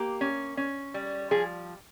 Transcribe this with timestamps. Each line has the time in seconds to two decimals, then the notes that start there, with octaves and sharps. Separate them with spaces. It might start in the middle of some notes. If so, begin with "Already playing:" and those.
Already playing: A#3 G4
0.21 C#4
0.57 C#4
0.94 G3
1.31 F3 G#4